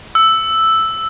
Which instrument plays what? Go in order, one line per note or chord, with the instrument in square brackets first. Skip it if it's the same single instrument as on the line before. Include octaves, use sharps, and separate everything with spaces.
[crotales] E6